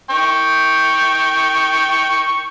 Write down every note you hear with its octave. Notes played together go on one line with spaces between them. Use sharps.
G5 C#6